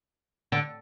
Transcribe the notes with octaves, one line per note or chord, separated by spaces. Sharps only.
D3